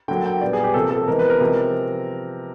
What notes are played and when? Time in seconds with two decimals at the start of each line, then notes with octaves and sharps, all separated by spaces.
0.08 D3 F#3 A#3 G5
0.25 G5
0.41 A#2 G3 B3 D5
0.53 G#4
0.64 G4
0.74 C3 F3 A#3 A4
0.91 A4
1.08 C3 E3 G#3 B3 A#4
1.19 B4
1.30 A#4
1.40 C3 F3 G#3